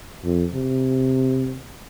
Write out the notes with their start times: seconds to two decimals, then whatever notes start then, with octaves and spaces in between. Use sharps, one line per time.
0.24 F2
0.54 C3